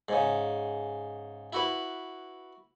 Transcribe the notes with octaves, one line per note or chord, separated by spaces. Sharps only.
G#2 C#3
E4 F#4 B4